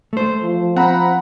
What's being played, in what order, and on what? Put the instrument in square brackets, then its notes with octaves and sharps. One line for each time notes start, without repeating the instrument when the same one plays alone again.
[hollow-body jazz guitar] A3 C5
[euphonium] F3
[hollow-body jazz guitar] C4 [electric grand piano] F#5 A#5 B5